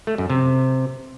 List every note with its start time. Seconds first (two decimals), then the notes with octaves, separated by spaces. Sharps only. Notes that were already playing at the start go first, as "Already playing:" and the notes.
0.07 A3
0.18 F#2
0.30 C3